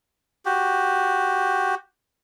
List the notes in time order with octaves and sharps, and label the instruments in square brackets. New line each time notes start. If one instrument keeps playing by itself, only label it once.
[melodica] F#4 G4